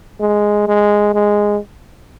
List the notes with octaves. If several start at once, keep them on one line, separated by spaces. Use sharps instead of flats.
G#3
G#3
G#3